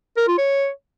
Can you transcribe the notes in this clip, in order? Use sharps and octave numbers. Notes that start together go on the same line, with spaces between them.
A#4
F4
C#5